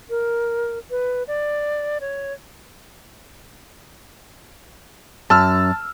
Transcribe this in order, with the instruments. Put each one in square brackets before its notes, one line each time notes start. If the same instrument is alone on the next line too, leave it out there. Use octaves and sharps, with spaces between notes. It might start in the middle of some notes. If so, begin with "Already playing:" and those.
[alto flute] A#4
B4
D5
C#5
[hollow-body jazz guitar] F#2 [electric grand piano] A5 E6 F6